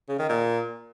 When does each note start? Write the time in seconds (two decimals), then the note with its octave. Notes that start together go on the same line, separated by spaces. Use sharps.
0.09 C#3
0.19 D#3
0.29 A#2